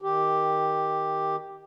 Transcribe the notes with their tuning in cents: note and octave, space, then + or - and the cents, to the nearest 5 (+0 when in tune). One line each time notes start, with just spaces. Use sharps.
D#3 +0 G4 +0